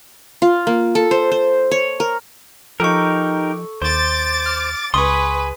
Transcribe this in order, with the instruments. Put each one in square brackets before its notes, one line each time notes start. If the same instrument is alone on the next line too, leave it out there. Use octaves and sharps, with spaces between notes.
[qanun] F4
A#3
A4
C5
C5
C#5
A#4
[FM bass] F3 [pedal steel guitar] D#4 G4 A#4 [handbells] A4 C#6
[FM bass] D#2 [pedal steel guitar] C5 [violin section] D6 A6
[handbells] F6
[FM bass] C#2 [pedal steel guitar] G#4 C6 [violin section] B4 [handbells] C#6 D#6